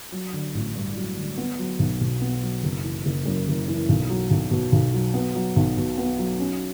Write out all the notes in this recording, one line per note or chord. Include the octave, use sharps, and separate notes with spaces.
F#3
D3
A1
G2
F#3
D3
B3
F#3
B1
B2
B3
F#3
F#1
E3
F#1
F#2
F#1
E3
B1
F#3
B1
B2
B1
F#3
B3
F#3
B1
B2
B3
F#3
C#4